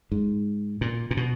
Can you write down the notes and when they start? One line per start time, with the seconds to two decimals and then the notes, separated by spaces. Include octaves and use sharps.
0.12 G#2
0.81 A#2
1.11 A#2
1.17 B2